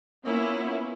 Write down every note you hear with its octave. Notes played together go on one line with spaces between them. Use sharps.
A#3 B3 C#4 E4 F4